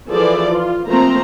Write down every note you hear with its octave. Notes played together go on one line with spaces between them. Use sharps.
E3 F3 G#4 A4 D5
F4
F3 A3 A#3 C4 C5 A#5